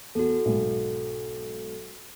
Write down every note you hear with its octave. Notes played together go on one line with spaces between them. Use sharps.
E2 F#4 A4
B1 G#2